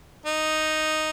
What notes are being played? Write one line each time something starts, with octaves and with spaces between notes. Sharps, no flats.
D#4